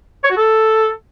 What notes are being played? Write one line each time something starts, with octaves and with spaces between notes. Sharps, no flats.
C#5
F#4
A4